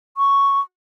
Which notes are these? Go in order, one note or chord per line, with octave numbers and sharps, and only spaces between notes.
C#6